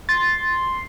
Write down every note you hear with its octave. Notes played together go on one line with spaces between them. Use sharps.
C6 A6